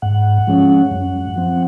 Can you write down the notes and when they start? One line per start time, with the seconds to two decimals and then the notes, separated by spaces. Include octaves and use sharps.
0.02 G#2 F#5
0.47 F3 G#3 C#4
0.91 F#2
1.36 F3 C4